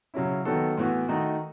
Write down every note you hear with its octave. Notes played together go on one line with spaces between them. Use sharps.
C#3 F#3 C#4 E4
D#3 F#3 B3 F#4 A4
A2 E3 B3 F#4
D#3 A3 D#4 F#4